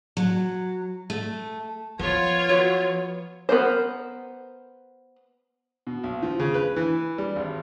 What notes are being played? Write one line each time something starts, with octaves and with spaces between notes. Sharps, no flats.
F#3
A3
F3 B3 F4 C#5
F#3 B3
B3 A#4 C5
B2
B1
F3
C#3
B4
E3
G3
G#1